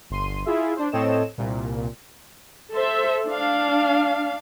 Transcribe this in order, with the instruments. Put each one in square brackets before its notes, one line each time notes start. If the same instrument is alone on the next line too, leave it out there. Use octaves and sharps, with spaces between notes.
[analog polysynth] G1 C6 D#7
E4 F4 G#4 E5
D4 C5
A2 C4 A4 C#5 D#5 E7
C2 A#2
[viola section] A4 C5 E5
D4 F5